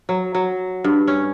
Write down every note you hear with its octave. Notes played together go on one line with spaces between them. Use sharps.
F#3
F#3
G2
C#4